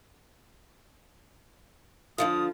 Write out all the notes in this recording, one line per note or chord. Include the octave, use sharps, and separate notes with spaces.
D3 F3 F4 D#6